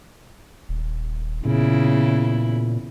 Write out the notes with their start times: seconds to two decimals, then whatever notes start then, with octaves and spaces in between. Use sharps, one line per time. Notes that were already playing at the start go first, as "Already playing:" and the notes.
0.69 D#1
1.45 E2 A#2 C#3 E4